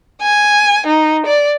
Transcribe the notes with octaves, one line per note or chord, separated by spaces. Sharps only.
G#5
D#4
D5